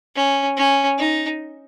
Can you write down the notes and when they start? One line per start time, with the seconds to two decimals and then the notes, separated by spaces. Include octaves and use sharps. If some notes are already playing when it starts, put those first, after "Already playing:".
0.16 C#4
0.57 C#4
0.98 D#4